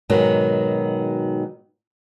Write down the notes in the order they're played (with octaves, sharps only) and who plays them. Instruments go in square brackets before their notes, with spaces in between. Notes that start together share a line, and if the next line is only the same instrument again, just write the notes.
[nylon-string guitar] G#2 B2 D#3 F#3